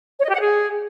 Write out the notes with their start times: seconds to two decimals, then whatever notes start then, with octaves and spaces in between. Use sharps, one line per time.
0.18 C#5
0.24 D#5
0.29 G4
0.35 F#5
0.40 G#4